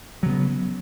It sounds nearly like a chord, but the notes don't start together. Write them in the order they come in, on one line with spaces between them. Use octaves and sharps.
F#3 C#3 B3